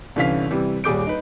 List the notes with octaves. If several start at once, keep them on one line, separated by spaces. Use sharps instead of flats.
C2 D3 E3 C#4 F5 B6
C3 E3 G3
D#1 G3 G#4 D6 G6 D7
D#4 B4